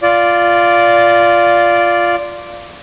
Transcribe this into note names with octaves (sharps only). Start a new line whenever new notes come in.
F4 D5